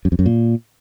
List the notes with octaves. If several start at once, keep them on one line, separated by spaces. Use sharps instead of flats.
F#2
F2
F#2
A#2